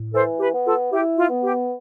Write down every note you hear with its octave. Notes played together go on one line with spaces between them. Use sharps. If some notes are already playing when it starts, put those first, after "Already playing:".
Already playing: A2
E3 A4 C5
G4 B4
B3
F4 A4
E4 G4
F4
B3
G4